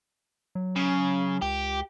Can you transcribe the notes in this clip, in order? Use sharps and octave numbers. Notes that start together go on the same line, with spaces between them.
F#3
C#3
C#2 G4